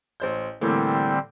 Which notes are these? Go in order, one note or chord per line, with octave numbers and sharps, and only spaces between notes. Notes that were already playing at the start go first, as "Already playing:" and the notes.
A1 C5 G6
A2 D3 E3 G3 A#3 C4